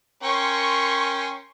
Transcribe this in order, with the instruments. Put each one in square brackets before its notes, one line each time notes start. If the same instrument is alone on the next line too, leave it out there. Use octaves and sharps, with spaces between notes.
[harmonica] C#4 A#4 G5 [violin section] C6 C#6